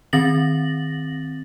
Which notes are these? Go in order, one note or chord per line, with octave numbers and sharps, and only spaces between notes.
D#3 C4 A6 A#6 F#7